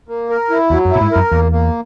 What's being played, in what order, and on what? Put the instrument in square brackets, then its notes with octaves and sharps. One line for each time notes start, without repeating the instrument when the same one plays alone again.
[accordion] A#3
A#4
E4
[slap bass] E2 [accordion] F#3
[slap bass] F#2
[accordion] E4
[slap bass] A#2
G#2
[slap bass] F#2 [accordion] A#4
[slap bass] E2 [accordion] A#3
[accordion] A#3